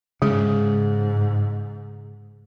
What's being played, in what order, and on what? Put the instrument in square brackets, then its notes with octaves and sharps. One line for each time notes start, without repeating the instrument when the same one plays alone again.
[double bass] G#2 [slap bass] C#3 [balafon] G#3